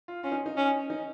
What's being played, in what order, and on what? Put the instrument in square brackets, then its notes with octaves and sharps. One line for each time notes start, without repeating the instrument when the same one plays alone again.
[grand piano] F4
[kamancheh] C#4 [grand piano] F4
[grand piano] D#4
D#4
[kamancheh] C#4
[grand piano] D#4